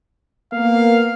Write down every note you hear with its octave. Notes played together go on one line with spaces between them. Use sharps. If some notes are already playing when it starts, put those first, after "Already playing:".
A#3 B3 F5